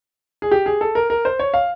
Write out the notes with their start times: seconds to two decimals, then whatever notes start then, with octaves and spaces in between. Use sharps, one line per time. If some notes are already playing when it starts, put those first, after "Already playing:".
0.42 G#4
0.51 G4
0.66 G#4
0.81 A4
0.95 A#4
1.10 A#4
1.25 C5
1.39 C#5
1.54 F5